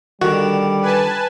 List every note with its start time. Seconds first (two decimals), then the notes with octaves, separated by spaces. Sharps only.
0.22 D3 D#3 G3 F#4
0.82 B4 G#5 A5